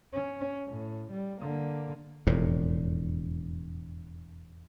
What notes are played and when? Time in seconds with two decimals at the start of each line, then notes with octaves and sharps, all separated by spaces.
0.13 C#4
0.67 A2
1.11 G3
1.40 D3 A#3
2.27 E1 F2 A2